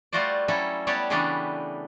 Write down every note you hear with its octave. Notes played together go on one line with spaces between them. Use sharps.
G3 A3 F4 F#4 C5 D5
F#3 G3 C#4 E4 A4
G3 B3 G4 C#5 D5 A5
C#3 E3 G3 A3 B3 D4